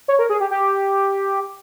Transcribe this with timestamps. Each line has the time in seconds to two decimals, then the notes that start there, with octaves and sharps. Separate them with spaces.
0.08 C#5
0.19 A#4
0.30 G#4
0.40 G4
0.51 G4